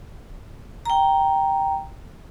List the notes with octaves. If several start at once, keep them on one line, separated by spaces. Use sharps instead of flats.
G5 A#5